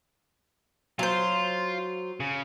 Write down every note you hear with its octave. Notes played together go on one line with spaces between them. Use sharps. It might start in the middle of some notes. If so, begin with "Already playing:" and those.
F#3 F4 C5
C#3